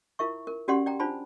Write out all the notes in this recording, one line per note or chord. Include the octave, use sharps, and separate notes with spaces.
E4 F4 A#4 E5 C#6
A#4
C#4 F#4 G4 D5 F#5 C6
D5 G5 A#5
D4 F4 C5 A5 B5